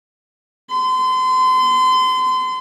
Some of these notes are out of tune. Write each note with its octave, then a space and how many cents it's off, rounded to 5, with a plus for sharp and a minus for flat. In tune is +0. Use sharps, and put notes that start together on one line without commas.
C6 -35